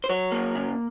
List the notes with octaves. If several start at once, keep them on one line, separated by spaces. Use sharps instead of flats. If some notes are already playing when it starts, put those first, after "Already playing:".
C5
F#3 C#5
A#3
C#3